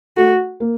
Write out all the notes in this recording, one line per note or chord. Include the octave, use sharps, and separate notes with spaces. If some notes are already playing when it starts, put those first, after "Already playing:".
A3 F#4
A#3